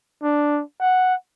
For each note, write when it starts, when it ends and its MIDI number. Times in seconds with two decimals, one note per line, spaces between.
0.23 0.62 62
0.81 1.14 78